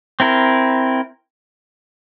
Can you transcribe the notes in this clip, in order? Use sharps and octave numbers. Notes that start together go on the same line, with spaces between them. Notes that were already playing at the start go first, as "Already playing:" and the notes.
C4 E4 A#4